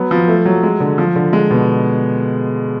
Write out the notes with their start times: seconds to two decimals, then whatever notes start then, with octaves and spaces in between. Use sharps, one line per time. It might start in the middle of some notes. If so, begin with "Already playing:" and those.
Already playing: F#3 B3
0.11 F3
0.28 A3
0.45 F#3
0.63 G#3
0.80 D3
0.98 F3
1.16 D3
1.33 G#3
1.51 B2